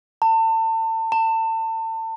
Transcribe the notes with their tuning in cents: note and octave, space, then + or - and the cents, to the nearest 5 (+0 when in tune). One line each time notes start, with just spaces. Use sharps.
A5 +35
A5 +35